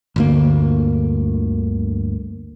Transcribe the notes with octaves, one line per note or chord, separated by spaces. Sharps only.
G1 D2 A#3